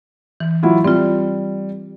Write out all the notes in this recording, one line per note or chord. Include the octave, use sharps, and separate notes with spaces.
E3
F#3 E4 F4
G3 C4 F4